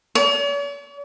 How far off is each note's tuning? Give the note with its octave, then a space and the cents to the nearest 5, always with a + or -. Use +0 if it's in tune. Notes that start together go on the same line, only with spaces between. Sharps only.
C#5 +45